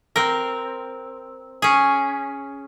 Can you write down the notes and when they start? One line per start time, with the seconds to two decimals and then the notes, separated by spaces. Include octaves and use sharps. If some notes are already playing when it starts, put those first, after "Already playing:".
0.16 C4 A#4
1.62 C#4 G#4